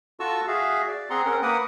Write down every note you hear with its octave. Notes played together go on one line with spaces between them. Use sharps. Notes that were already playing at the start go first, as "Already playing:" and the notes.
F4 F#4 A4 A5 C#6 E6
F#4 G#4 E5 F5
D5
C4 G#4 F#5 A#5 C6
C4 C#4 A#4 F#5
A#3 A#4 B4 F#5 D#6